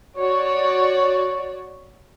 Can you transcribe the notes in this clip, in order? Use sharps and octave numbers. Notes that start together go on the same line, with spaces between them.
F#4 C#5 D5